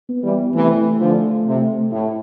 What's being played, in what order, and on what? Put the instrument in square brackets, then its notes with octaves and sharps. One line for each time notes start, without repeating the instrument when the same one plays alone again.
[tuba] B3
[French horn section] E3 G3
[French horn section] C3 E3 [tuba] A3
[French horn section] D3 F3
C3
A2